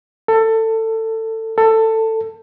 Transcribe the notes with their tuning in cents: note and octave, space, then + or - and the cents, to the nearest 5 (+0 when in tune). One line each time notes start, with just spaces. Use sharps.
A4 +20
A4 +15